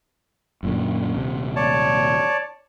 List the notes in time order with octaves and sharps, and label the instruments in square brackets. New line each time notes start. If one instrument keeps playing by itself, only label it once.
[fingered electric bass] F#2 A#2 D3
D#1 C3
[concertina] C#5 D5 A5